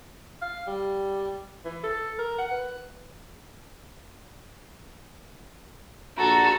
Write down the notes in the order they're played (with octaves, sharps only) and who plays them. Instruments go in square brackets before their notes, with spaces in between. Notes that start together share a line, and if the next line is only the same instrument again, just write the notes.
[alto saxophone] F5
G3
E3
A4
A#4
F#5
B4
[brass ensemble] A#1 D4 A#5 [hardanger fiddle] F#4 A4